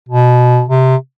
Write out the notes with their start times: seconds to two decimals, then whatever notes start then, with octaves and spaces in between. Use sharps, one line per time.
0.09 B2
0.69 C3